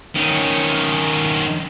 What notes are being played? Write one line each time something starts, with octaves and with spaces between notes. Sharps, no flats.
D#3 C#4